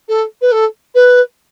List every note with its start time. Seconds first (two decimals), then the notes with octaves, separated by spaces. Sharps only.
0.09 A4
0.41 B4
0.52 A4
0.95 B4